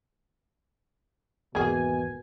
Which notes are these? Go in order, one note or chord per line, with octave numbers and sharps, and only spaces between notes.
G#1 E2 B2 A#3 G#4 G#5